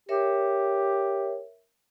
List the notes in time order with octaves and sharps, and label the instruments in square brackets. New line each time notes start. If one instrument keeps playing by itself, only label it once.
[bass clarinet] G4 [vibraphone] A#4 C#5 E5